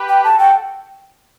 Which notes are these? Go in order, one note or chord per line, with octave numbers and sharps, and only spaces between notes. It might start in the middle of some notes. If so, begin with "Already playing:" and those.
Already playing: G4 B4
G5
F#4 A4 A5
G5